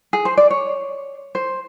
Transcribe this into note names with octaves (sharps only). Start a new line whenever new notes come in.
G#4
C5
D5
C#5
C5